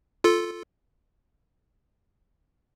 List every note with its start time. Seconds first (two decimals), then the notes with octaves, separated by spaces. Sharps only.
0.24 F4 A4